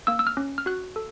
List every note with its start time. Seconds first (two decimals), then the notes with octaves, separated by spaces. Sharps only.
0.07 A#3 E6
0.19 E6
0.27 F6
0.37 C#4
0.58 F6
0.66 F#4 F#6
0.96 A4